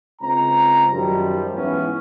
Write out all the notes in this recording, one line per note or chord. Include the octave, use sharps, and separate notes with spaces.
C#2 C4 A#5
F#2 D#3 F3 G3
G#2 E3 B3 C#4